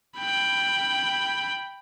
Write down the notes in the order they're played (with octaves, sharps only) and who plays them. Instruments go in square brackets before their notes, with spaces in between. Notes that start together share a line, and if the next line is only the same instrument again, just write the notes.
[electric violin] G5 B5